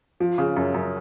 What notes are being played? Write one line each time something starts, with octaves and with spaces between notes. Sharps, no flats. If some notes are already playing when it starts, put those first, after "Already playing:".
F3
C#3
F#2
F#2